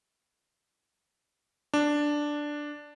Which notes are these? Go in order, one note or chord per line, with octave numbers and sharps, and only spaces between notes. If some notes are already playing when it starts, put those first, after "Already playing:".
D4